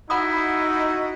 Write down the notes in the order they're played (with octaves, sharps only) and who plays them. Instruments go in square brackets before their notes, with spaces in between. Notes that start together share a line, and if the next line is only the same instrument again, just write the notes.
[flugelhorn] D#4 [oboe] E4 [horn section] F#4 [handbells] F#5 B5 D#6